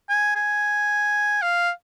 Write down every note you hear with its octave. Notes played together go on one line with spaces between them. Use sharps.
G#5
G#5
F5